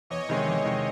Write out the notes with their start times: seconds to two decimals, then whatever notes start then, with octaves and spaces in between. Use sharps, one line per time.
0.10 E2 C#5 D#5
0.29 C3 D#3 G#3
0.47 E2
0.65 C3 D#3 G#3